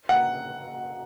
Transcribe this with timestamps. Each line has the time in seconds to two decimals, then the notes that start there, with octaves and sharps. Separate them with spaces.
0.09 F#5